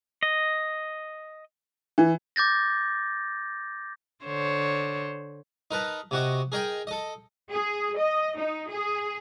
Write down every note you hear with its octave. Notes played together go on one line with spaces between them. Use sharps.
D#5
E3
D6 G6 A6 A#6
D3 C5 C#5
D#4 A#4 B4 A5
C3 F#4 D#5
G#4 A#4 D#5 G5
A4 D#5
G#4
D#5
D#4
G#4